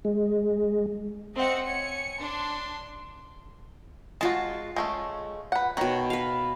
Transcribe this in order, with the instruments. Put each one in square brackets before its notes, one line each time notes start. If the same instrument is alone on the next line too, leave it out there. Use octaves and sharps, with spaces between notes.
[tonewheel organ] G#3
[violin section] C4 F#5 C#7 [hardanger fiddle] D#5 E5
[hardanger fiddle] C#5 G#5 [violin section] C#7
[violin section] D4 [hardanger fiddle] C6
[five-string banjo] G#3 F#4 [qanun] F4 A5
[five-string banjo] G#3 A3 C#4
B4 F#5
[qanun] B2 F#5 [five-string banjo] D#3 C#5
[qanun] B4 F5